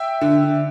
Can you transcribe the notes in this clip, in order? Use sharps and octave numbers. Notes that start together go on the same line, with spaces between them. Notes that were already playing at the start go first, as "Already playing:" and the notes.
Already playing: E5 G5
D3